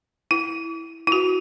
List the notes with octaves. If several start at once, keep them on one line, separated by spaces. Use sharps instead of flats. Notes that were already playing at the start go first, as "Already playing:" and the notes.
E4
E4
F#4